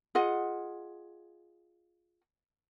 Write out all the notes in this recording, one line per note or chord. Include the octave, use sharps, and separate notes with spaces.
F4 G#4 D#5 F#5